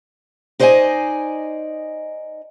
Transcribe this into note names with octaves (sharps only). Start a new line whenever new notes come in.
D#4 C5 D5 D#5 G5 G#5